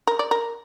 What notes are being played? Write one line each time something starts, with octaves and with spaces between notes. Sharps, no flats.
A#4
D5
A#4